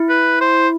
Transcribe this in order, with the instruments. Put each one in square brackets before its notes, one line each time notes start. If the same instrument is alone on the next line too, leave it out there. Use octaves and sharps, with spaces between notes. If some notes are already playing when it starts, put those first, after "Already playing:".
Already playing: [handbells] E4
[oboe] B4
C5